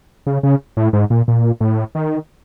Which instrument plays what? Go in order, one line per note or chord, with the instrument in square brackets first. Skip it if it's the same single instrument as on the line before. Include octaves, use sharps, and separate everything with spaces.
[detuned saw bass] C#3
C#3
A2
G#2
A#2
A#2
A2
D#3